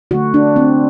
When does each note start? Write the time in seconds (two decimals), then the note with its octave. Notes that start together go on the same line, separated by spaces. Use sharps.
0.11 D3 A3 F#4
0.34 D4
0.56 C4